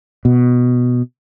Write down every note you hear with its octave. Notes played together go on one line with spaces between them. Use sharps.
B2